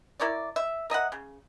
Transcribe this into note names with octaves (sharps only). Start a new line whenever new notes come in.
E4 A#4 C#5 D5
E5
A#4 D#5 E5 F#5
C#3